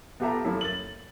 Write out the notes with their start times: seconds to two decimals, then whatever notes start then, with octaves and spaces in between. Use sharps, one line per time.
0.20 B3 F4 G4 A4 E5 A#5
0.44 F#2 A3 A#3 E4
0.61 A6 F#7